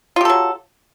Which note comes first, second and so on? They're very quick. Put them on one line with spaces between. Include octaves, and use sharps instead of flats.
F4 G4 A4 F#3